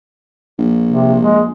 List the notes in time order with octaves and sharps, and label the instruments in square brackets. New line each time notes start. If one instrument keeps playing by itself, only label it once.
[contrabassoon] A#1
[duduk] C3
G#3